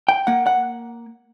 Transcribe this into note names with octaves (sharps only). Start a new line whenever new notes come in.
G5
A#3 F#5
F#5